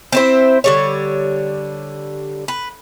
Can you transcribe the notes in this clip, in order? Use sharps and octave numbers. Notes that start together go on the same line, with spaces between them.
C4 E4 C5
D3 G3 C#5
B4